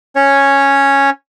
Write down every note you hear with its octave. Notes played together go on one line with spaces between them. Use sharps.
C#4 C#5